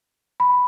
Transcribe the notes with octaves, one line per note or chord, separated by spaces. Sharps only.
B5